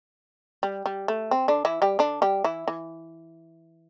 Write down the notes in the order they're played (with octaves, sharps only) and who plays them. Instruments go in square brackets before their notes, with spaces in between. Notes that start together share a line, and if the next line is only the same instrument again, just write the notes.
[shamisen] G3
G3
A3
C4
D3 D4
E3 E4
G3 G4
D3 D4
G3 G4
E3 E4
E3